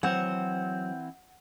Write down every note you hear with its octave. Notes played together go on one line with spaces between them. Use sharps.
E3 F#3 C4 C5 C#5 F#5